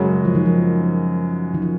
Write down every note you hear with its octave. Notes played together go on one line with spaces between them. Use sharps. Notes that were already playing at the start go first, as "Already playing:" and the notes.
Already playing: F#2 C#3 G#3 C#4 F#4
F3
D#3
F3
D#3
F3